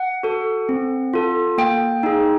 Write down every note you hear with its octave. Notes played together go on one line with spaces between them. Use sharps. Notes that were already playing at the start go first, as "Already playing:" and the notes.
Already playing: F#5
F#4 A4
C4
F4 A4
A#3 G5
D#4 G#4